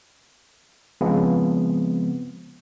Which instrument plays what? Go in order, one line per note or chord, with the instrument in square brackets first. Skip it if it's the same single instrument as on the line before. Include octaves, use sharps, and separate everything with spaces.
[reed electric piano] C#3 F3 G#3 B3 C4